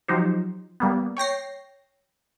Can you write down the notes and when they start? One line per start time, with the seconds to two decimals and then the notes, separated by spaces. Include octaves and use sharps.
0.08 F3 F#3 D#4 G4 C5
0.80 G3 A#3 B3
1.17 C#5 G5 A#6 C7